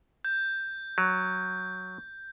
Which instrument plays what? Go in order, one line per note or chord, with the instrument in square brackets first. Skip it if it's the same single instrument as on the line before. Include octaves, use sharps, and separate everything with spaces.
[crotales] G6
[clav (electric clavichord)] F#3